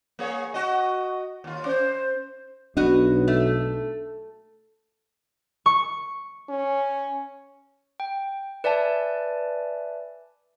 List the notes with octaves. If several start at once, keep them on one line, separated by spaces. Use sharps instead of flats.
A#3 G#4 C#5
F#4 D#5
D#2 F4
C#4 C5
B1 B3 D4 F#4 D#5
A3
C#6
C#4
G5
B4 D5 E5 G#5 A5